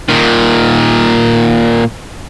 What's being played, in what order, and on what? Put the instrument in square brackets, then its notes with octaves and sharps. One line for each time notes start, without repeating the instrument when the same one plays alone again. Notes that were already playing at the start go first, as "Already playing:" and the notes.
[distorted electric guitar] A#2 D#3